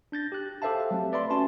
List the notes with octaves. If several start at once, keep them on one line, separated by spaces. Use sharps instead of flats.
D4 G6 A6 A#6
G4 F#6
G4 A4 C5 E5 F5 A5
F#3 A3 C4
B4 D5 E5 B5 C6
C#4 F#4 C#5 A5 C6